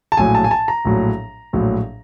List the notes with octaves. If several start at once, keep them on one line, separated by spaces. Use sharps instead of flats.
A5
A#1 A2 F#3 G#5
A5
G#5
A5
A#5
A#1 A2 F#3
A#1 A2 F#3